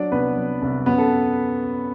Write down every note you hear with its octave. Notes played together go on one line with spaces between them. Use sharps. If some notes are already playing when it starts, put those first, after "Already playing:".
Already playing: F#3 D4 D5
C2 B3 B4
F#3
C2
F#2 B3 B4
A4